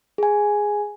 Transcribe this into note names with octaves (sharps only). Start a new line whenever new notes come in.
G#4 G#5